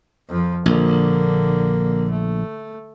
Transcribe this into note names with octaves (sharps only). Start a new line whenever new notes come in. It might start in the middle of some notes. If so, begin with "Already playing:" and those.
F2 F3
A#1 D3 A#3
A3